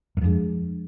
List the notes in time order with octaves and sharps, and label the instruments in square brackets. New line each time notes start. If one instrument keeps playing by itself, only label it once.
[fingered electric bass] F#2
[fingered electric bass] F2 [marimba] F3 G#3 D4 G#4